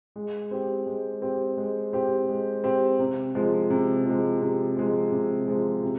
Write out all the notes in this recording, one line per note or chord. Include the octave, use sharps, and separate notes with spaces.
G#3
C4 G4
G#3
C4 G4
G#3
C4 G4
G#3
C4 G4
C3
F3 G#3
C3
F3 G#3
C3
F3 G#3
C3
F3 G#3
C3